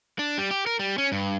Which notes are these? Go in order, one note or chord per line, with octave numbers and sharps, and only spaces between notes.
D4
G3
G4
A#4
G3
C#4
G2